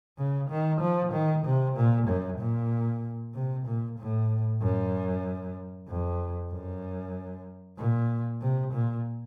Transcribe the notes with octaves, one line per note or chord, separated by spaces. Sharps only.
C#3
D#3
F3
D#3
C3
A#2
F#2
A#2
C3
A#2
A2
F#2
F2
F#2
A#2
C3
A#2